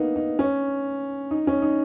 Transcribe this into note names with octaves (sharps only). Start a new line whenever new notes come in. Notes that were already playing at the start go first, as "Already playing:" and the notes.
Already playing: A#3 B3 D#4
D#4
C#4
D#4
C#4
D#4